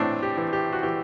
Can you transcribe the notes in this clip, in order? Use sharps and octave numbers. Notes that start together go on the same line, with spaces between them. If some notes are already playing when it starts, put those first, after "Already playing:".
Already playing: A2 E3 C4 D4
G4
E3
G4
F#4
E3 G4